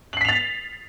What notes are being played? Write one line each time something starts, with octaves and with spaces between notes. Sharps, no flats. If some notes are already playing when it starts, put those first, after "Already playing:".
A6 B6 C7 F7 F#7